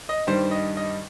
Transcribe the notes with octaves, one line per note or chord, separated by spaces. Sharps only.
D#5
G2 D#3 G3 C5
D#5
D#5